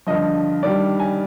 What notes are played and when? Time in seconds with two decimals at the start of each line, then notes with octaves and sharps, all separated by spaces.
0.06 G2 D3 F3 D#5
0.63 G2 D#3 G3 D5
1.00 G#5